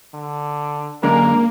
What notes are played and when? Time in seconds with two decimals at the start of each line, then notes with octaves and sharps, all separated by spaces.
0.14 D3
1.03 F#2 D3 G#3 A#3 A#4